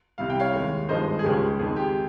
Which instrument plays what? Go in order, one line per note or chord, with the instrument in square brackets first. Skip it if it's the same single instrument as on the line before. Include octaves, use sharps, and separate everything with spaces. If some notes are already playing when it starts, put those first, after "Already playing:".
[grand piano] C2 C3 G3 F5
G5
C#5 F5
D#2 D#3 G#3
G#1 G2 F3 G#3 C5 D#5
G#4
C#2 C#3 F3 G#3 G4
F2 D#3 G#3 G#4
G4